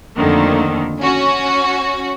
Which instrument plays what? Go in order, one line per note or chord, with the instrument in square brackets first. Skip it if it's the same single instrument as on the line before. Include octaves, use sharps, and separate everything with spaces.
[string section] F2 D3 D#3 A3 A#3
C#4 F#4